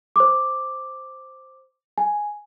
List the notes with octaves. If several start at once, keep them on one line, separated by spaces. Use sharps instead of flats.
C5 D6
G#5